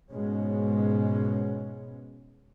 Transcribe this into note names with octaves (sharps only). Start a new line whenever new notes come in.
G#2 B2 G#3 C#4